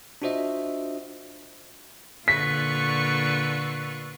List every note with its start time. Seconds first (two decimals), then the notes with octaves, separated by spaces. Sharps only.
0.22 D4 F4 F#4 C5 D#5 E5
2.28 A#2 D3 F4 B4 C#6 B6